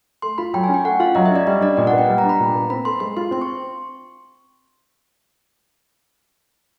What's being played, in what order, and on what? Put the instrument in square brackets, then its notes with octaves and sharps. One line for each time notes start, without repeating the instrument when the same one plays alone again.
[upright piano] A3 [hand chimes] C6
[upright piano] F4 [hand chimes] B5
[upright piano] F#3 [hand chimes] G5
[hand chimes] G#5
[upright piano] C#4
[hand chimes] G5
[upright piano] A3 [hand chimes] F#5
[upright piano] F4 [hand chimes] F5
[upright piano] F#3 [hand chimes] D#5
[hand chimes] E5
[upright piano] C#4 [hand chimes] D5
[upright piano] G3 [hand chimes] D#5
[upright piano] D4 [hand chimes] D5
[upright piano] A#2 [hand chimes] D#5
[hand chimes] F#5
[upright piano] B3
[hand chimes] G5
[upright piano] G3
[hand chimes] A#5
[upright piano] D4
[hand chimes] B5
[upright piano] A#2
B3
[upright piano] C4 [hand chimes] B5
[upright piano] A4 [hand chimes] C6
[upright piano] G#3 [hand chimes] C6
[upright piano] F4 [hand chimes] C6
[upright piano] C4 [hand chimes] C6
[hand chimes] C#6